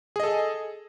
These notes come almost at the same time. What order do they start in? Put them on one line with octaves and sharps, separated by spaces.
G#4 D#5 A4